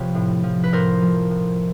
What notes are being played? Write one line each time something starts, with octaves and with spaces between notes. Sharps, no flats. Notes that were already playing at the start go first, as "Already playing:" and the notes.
Already playing: C3 F3 B4 C#5
A2
F3
B4
A2 A#4 C5
F3
A2